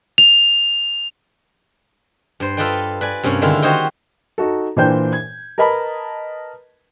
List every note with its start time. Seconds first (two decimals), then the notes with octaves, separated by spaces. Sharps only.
0.18 F7
2.40 G2 C5
2.57 F4 A4 B4 D5 D#5 G5
3.01 B4 D5 G#5
3.23 G2 C3 A#3 C#4
3.42 D3 D#3 G#3 E4 F4
3.62 F#4 G4 C5 C#5 D#5 G5
4.38 D#4 F#4 A4
4.76 A#2 E3 D4 C5 G5 G6
5.13 G#6
5.58 A#4 B4 D#5 A5 B5